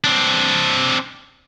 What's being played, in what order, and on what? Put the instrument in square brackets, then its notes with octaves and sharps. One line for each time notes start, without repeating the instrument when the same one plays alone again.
[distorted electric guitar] C4 D4